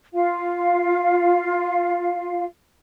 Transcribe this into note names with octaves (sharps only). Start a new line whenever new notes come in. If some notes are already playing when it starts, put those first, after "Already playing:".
F4 F5